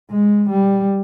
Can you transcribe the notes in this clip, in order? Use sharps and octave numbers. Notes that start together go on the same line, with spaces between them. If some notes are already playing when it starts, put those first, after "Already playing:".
G#3
G3